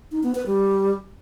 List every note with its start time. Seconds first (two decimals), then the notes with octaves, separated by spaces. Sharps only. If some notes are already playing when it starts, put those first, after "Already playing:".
0.12 D#4
0.23 B3
0.35 B4
0.47 G3